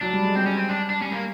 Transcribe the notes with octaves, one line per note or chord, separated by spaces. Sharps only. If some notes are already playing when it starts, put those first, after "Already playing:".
F#3 D4
G3
G#3
G3 C4
C#4
C4
D4
D4
G3 C#4
A#3